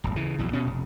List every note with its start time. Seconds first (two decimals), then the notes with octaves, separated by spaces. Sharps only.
0.04 D1 G1
0.16 C#3 E3
0.38 A#1 E2 F#3
0.53 B2 C#4
0.67 F1